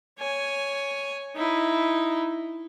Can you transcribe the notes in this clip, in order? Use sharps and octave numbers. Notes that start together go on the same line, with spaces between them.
C#5 G#5
D#4 E4